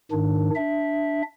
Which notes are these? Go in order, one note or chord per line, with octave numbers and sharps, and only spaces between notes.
G#2 D#3 D4
D4 E5